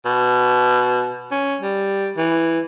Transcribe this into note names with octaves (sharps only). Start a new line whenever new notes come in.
B2
C#4
G3
E3